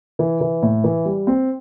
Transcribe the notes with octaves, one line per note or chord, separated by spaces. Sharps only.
E3
E3
A2
E3
G3
C4